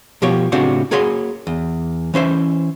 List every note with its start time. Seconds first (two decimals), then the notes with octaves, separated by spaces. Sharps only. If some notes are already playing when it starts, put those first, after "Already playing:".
0.22 B2 F3 G4 C#5
0.52 A2 C#3 C4 D4 F#4 G4
0.91 A#3 F#4 G#4 C#5 B5 C6
1.47 E2
2.14 E3 C#4 C5 E5